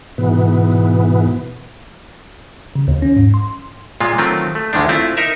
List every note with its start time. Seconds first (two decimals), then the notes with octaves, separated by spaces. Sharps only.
0.18 G#2 B2 E3 B3
2.76 C#3
2.88 D#2
3.02 C#4
3.17 G#2
3.34 C6
4.00 A#2 G#3 F4
4.18 D#3 F#3 A3 C4 F4
4.55 A3
4.73 D2 D3 D#3 G#3 D4
4.89 A3 C4 E4 F4
5.17 D#4 A#4 E5